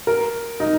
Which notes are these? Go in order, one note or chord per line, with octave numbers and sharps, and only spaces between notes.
A#4
D#4